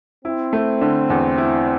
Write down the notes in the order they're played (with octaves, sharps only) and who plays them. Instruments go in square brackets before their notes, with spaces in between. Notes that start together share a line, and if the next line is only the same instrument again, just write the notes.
[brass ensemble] C4 [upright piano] E4
[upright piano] A3
D3
E2
E4